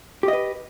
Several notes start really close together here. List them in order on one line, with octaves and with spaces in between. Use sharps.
G4 D#5 B4